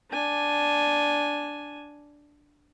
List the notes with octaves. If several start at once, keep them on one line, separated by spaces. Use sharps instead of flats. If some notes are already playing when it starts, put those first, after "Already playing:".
D4 G#5